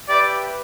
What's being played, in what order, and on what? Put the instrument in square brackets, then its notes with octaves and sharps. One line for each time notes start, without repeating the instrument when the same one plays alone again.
[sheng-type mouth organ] G4 B4 E5 G5 [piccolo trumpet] D5
[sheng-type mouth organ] B4